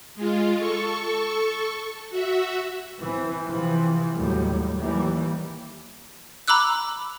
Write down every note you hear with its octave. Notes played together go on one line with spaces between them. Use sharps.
G#3 F4
A4 C#6
F#4 E5
E3 C4
C3 E3 F3
D#2 A2 F#3 G3
D#2 E3 G3 A#3
A#5 B5 D6 E6 F#6